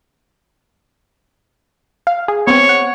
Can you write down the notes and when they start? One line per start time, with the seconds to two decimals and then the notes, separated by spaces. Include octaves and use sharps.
2.07 F5
2.28 G#4
2.47 B3 C4 C#5
2.69 F#5